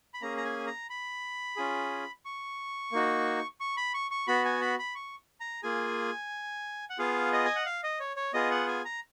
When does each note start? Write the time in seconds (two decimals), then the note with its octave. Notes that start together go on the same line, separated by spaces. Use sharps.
0.14 B5
0.22 A#3 C#4 G#4 A#5
0.37 A#5
0.45 G#5
0.67 A#5
0.90 B5
1.56 C#4 F4 G#4
2.25 C#6
2.92 A#3 D#4 F#4
3.60 C#6
3.77 B5
3.94 C#6
4.11 C#6
4.27 B3 F#4 B5
4.45 G#5
4.61 B5
4.79 B5
4.95 C#6
5.40 A#5
5.63 A#3 F4 G#4 G#5
6.90 F#5
6.98 B3 F4 G#4 F5
7.33 D#5
7.45 G#5
7.55 F#5
7.66 F5
7.84 D#5
8.00 C#5
8.16 C#5
8.34 B3 F4 G#4 D#5
8.51 F#5
8.68 G#5
8.85 A#5